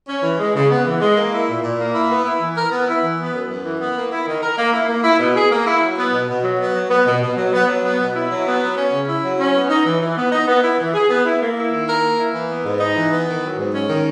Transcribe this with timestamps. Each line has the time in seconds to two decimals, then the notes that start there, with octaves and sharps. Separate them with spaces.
0.08 C#4
0.23 E3
0.39 G#3
0.55 C#3
0.70 B3
0.86 E3
1.01 G#3
1.16 A#3
1.32 E4
1.48 A#2
1.63 A#2
1.78 A#3
1.95 E4
2.10 B3
2.25 E4
2.41 E3
2.56 A#4
2.72 B3
2.88 E4
3.03 E3
3.19 B3
3.33 F#2
3.49 F#2
3.64 E3
3.80 B3
3.96 A#3
4.12 E4
4.27 D#3
4.42 A#4
4.58 A#3
4.73 E4
4.88 A#3
5.04 E4
5.19 B2
5.35 G#4
5.51 A#3
5.66 E4
5.82 F#3
5.97 B3
6.13 B2
6.29 B2
6.44 F#3
6.60 B3
6.75 F#3
6.90 B3
7.06 B2
7.22 B2
7.37 F#3
7.53 B3
7.68 F#3
7.84 B3
7.99 B2
8.15 E4
8.30 F#3
8.46 B3
8.62 F#3
8.77 C#4
8.92 C#3
9.08 E4
9.24 F#3
9.39 C#4
9.54 B3
9.69 D#4
9.85 E3
10.01 E3
10.16 B3
10.32 D#4
10.47 B3
10.63 E4
10.79 E3
10.94 G#4
11.10 B3
11.25 E4
11.41 A#3
11.56 E4
11.72 D#3
11.87 A#4
12.03 A#3
12.19 E4
12.33 E3
12.49 B3
12.64 G#2
12.80 D#4
12.96 E3
13.11 B3
13.28 D#3
13.42 F#3
13.58 G#2
13.74 C#4
13.88 D#3